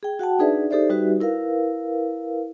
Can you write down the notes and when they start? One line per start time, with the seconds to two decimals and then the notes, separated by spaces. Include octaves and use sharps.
0.03 G#4 G5
0.19 F#4 F#5 G5 A5
0.39 D4 D#4 G#4 B4 D5 E5
0.70 D#4 G4 A4 C5 D5 E5
0.90 G3 D#4 F#4 G4 B4 E5
1.20 E4 A#4 B4 F5